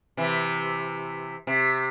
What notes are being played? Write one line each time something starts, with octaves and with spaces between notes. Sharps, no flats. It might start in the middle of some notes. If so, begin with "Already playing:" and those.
C3 E3
C3